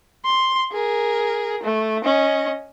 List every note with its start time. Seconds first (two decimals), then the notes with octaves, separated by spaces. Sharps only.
0.25 C6
0.73 G#4 A#4
1.63 A3
2.04 C#4 D#5